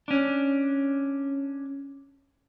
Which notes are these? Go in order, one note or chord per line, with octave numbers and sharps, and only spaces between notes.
C#4 D4